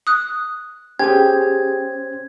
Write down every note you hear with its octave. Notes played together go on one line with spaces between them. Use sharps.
D#6 F#6
C#4 G4 G#4 C5 G#6